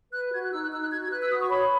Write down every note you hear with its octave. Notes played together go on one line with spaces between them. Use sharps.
B4 F#6
F#4 G#6
F#6
D#4 E6
F#6
D#4 E6
F#6
F#4 G#6
G#6
B4 F#6
E6
F#4 D#6
C#6
C#5 B5